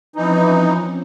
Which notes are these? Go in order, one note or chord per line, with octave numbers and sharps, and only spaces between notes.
E3 F3 C4 C#4 D#4